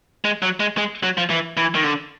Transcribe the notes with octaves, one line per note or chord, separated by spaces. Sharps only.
G#3
F#3
G#3
G#3
F#3
F3
E3
E3
D#3
D3